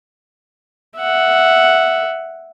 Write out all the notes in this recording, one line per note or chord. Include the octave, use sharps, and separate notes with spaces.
E5 F#5